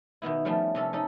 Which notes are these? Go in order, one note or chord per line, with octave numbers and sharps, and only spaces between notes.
B2 D#3 B3 E4
F3 G3 A3 B3 C#4
C3 C#4 A4
C#4 D#4 A4